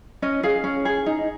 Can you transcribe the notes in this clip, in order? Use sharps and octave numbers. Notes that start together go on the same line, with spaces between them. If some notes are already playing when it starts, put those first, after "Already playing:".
C#4 D#5
G#4 F5
C#4
G#4
D#4